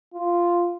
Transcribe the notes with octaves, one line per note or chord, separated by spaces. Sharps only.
F4